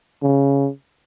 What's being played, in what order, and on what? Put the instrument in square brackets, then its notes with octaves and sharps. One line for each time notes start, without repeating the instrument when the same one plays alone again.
[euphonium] C#3